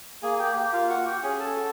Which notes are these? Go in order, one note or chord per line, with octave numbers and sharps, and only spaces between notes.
A#3 G#4 G#5
G#5
G4 G5
A#3 G4 G5
F4 F5
F#4 F#5
G4 G5
C#4 G#4 G#5
A4 A5
F#4